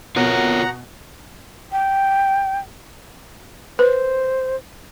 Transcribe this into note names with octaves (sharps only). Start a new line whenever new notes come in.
B2 F4 A#4 C#5 F#5 A#5
G5
B4 C5